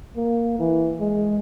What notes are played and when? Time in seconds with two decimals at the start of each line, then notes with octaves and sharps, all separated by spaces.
0.17 A#3
0.59 E3
1.00 G#3